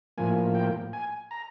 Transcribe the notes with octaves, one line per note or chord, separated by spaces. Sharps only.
A2 F3 A#3 G#5
G5
G#5
A#5